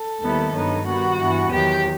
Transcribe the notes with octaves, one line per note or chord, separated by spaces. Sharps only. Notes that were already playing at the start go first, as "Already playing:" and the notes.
Already playing: A4
D#2 D#3 G3 B3 E4
G2 F#3 B3 D#4
D#3 G3 B3 F#4
G2 E3 B3
E2 D#3 F#3 G4